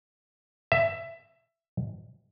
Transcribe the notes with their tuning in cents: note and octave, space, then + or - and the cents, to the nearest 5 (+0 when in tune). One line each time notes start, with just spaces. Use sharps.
E5 +15